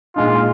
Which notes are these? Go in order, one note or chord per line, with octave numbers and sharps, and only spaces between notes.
A#2 G#3 D#4 F4